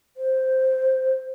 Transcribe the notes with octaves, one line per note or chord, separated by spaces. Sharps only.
C5